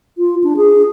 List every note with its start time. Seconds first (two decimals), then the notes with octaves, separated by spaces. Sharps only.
0.18 F4
0.44 D4
0.57 G#4